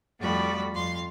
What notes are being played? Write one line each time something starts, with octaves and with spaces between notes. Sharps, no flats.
F2 F3 G3 A3 F#4 B5
F2 F5 C6